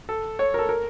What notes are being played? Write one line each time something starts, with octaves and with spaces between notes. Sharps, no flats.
A4
C#5
A#4
A4
A#4